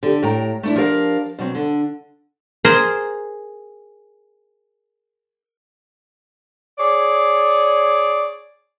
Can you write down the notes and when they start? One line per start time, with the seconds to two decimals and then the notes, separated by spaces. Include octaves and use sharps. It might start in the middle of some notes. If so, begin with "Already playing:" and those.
0.03 D3 G4
0.23 A2 G5 A#5
0.63 A3 D4 E4
0.76 F3 D4 G4 A#4 F5
1.39 B2 F#3 C4
1.55 D3
2.65 G#4 A#4 C5 A#5
6.79 G#4 C#5 D5